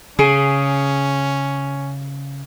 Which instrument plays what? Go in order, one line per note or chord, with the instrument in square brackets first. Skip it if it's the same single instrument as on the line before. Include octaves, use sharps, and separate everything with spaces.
[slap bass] C#3 [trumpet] C#4 [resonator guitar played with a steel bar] G#4